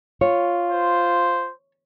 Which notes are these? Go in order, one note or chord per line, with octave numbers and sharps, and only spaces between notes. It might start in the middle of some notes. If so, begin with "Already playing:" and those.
F4 C#5
C5